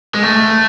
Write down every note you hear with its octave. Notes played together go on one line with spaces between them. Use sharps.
G#3
A3